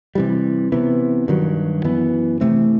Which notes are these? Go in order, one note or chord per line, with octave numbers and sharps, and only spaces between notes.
C3 E3 G3
C3 E3 B3
G2 D#3 F#3
F#2 E3 B3
C3 E3 A3 C4